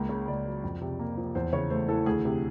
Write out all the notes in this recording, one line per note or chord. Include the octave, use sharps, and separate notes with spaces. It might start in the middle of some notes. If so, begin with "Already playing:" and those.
Already playing: C#2 A#3
C#3
C#2 D5
F#3
F2
C3
A#3
F3
E2 C5
C#3 C#5
A3 C5
E3 A4
D2 G#4
C3